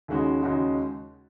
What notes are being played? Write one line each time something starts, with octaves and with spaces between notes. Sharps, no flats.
D#2 C#3 G#3 D#4 F#4
D#2 C#3 G#3 D#4 F#4